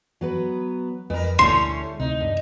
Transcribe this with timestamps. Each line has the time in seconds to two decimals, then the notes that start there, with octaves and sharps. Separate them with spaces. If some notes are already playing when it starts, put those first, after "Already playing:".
0.21 F#3 B3 B4
1.10 F2 G3 A#4 B4
1.39 D2 G3 A3 C#4 E4 A4 C6
2.00 D2 C3 D#4
2.21 G2